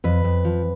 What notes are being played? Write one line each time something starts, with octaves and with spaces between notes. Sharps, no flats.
F2 B4
F2
F3